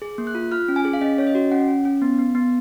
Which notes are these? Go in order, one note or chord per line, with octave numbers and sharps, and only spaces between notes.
G#4
A#3
F#6
F4
F4 F6
C#4
G#5
G#4
F5
C#4 D#5
C#4 C#5
D#5
F#4
C#4 F#5
C#4
C#4
B3
B3
B3